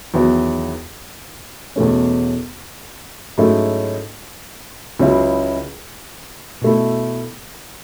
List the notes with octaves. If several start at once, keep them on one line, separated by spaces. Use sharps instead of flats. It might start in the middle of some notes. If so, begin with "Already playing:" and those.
E2 D#3 F#3 B3 E4
E2 B2 A3 C#4
G#2 F#3 A3 C#4 E4
C#2 C#3 F#3 C#4 E4
B2 A3 E4